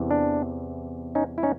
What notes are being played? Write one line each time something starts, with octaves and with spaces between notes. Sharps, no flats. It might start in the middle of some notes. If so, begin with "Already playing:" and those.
Already playing: E2 C3 E3
D4
C#4 D#4
E4
C#4 D#4